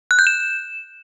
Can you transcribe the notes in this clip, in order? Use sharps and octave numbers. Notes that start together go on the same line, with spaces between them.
F#6
G6
E7